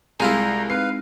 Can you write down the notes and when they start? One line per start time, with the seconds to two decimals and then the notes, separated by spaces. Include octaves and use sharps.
0.20 C2 G#3 E4 F4 G#4 A#5
0.70 C4 D#4 B4 F5 C7